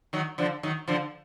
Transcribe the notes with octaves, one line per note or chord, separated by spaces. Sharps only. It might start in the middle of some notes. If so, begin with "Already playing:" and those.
D#3 F#3
D3 F3
D#3 F#3
D3 F3